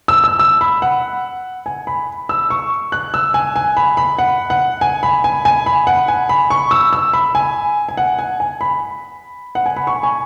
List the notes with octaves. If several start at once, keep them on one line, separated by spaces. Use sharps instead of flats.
E6
E6
E6
B5
F#5
G#5
B5
E6
C#6
F#6
E6
G#5
G#5
B5
B5
F#5
F#5
G#5
B5
G#5
G#5
B5
F#5
G#5
B5
C#6
E6
E6
B5
G#5
G#5
F#5
G#5
G#5
B5
F#5
G#5
B5
C#6
G#5